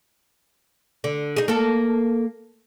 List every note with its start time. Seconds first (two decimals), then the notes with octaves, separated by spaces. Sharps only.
1.04 D3
1.36 D#4 G#4
1.48 A#3 A4